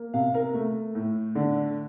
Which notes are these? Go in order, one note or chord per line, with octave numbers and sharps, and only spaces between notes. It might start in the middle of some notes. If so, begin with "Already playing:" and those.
Already playing: A#3
C3 F5
A#4
A3
A2
D3